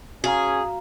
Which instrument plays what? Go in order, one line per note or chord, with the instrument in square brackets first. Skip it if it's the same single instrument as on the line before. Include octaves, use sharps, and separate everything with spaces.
[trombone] C#4 [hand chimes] F#4 F5 A#5 [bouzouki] G#4